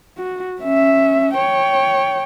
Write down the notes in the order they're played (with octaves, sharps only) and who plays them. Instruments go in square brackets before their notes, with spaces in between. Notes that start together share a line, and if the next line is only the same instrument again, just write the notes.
[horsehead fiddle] F#4
C#4 E5
C#5 G5